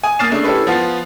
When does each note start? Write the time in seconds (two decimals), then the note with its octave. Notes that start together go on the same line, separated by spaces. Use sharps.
0.04 G#5 D#6
0.19 A#3 D#6 F6 A6 C7 E7
0.31 C#3 A3 D4
0.44 C#4 E4 G4 A4 B4
0.67 F3 B3 F4